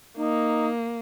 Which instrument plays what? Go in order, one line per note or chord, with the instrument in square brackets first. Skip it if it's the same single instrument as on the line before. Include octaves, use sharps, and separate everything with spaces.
[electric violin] A#3 [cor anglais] D#4